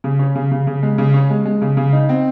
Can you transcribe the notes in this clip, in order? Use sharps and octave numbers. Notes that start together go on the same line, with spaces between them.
C#3
C#4
C#3
C#3
C#3
G#3
C#3
C#4
G#3
G#3
C#3
C#3
D#4
C4